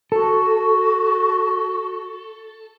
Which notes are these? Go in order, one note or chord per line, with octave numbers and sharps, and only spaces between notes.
F#4 A4